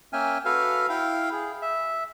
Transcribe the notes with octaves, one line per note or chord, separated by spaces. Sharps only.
A#3 C#4 E5 G5 G#5 F6
F#4 A4 B4 F5 F6
E4 F5 G5
G#4
E5